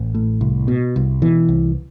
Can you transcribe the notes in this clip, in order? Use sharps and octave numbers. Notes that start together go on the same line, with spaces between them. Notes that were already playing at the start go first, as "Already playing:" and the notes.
Already playing: A1
A2
C2
B2
C2
B2 E3
C2